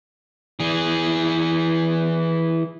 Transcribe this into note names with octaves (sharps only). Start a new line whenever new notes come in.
E3 G#4